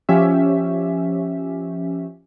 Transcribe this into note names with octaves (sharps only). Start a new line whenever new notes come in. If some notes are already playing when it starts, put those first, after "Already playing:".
F3 C#4 G4 E5